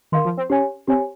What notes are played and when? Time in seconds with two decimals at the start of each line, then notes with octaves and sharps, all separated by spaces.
0.12 D#3 A#4 F5 C6
0.25 F3
0.37 C4
0.50 C#4 G4 C#5 G#5
0.87 C4 G4 C#5 G#5